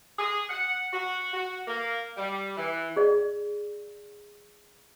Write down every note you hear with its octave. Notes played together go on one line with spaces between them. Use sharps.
G#4
F#5
F#4
F#4
A#3
G3
E3
G#4 D5